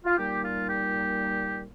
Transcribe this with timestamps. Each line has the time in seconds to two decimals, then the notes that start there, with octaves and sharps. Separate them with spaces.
0.05 F4
0.18 A#2 G3 A#3 D#4 G4
0.43 F4
0.68 G4